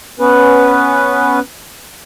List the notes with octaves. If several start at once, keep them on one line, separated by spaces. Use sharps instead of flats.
B3 C#4 B4